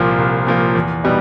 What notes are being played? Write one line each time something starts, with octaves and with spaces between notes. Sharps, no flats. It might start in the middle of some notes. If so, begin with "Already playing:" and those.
Already playing: C2 A#2 F3 A#3
C2
A#2 F3 A#3
E2
B2 G3 B3 D#4